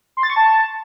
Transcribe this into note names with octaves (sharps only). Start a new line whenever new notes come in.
C6
A6
C#6
A5